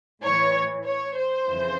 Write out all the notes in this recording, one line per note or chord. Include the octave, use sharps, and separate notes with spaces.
A2 E3 C#5
C#5
C5
F2 C#3 E3